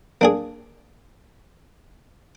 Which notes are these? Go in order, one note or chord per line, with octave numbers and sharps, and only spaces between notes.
A#3 D4 G#4